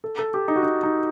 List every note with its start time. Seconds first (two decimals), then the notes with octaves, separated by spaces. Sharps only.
0.04 A4
0.19 A4
0.34 G4
0.48 D#4
0.56 F#4
0.63 D#4
0.83 D#4